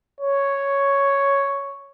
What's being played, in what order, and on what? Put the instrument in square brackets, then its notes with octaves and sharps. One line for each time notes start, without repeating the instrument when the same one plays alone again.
[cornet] C#5